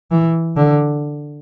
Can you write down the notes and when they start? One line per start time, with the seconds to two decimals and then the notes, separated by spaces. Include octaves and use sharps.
0.11 E3
0.56 D3